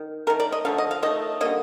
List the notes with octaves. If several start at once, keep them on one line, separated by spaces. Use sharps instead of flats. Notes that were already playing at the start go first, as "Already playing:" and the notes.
Already playing: D#3
D#3 A3 A#4
D5
D#5
D3 F3 A3 F5
D#5
F5
D#3 A3 D#5
D3 G3 A#3 D#5